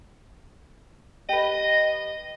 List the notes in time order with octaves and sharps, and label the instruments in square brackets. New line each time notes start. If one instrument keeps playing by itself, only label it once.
[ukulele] G4 B4 [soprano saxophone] D#5